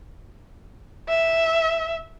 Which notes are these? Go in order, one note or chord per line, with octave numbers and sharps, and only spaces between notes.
E5